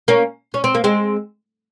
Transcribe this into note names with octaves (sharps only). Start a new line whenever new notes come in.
A#3 C#4
C#4
C4
A#3
G#3 C4